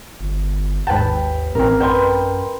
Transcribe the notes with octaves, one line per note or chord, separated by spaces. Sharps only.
G1
G#1 D#2 B4 G5 A5
A1 C4 A#4
F#2 B4 G5 B5 C6